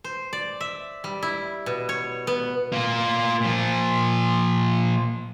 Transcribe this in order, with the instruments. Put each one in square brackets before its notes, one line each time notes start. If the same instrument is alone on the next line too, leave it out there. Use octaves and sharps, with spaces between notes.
[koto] C5
D5
E5
G3
E4
B2
C#5
B3
[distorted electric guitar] A#3 F4
A#2 F3